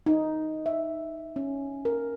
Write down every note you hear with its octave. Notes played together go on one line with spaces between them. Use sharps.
D#4
E5
C#4
A#4